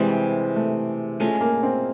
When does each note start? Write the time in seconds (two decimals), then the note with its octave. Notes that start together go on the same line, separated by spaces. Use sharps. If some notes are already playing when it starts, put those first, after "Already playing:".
Already playing: C3 E3 G3 G#3 C4
0.56 A3
1.20 G#3 A3 C#4 F4
1.41 A#3
1.63 C4